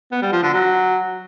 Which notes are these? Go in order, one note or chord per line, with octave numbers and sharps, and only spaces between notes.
B3
G3
F3
D3
F#3